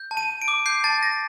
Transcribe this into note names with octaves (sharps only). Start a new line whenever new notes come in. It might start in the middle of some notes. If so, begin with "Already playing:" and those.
Already playing: G6
A5
D#7
A5
D7
D6
G6 C7
A5 A6
A5 A#6